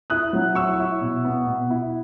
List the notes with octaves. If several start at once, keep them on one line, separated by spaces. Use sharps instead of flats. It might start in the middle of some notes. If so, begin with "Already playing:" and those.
E4 D#6 F#6
F#3
E4 C#6 E6
E4
B2
B3
B2
E4